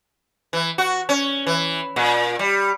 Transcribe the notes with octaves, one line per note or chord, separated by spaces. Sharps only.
E3
F#4
C#4
E3
A#2
G3